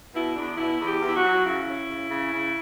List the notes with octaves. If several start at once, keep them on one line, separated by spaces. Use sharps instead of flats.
B2 E4
E2 D4
B2 E4
E2
G4
E2
E4
F#4
F#3
C#3 E4
C#4
C#3
C#3
C#3